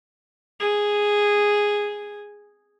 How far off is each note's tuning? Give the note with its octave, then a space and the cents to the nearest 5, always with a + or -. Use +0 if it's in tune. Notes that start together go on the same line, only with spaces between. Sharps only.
G#4 -5